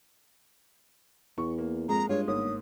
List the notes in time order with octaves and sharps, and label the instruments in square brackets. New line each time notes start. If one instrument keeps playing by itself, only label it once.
[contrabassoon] E2 [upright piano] C#6
[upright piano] A#3
[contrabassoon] F2 [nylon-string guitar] G#3 [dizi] A#5
[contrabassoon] G2 [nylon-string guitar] G#3 F4 [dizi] C#5
[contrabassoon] G1 [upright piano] G#2 A#3 [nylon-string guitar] C#5 [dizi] D#6